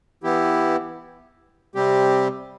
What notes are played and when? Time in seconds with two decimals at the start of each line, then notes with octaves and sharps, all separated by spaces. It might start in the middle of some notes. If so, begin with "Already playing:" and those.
0.23 E3 B3 E4 G4
1.75 C3 G3 C4 G4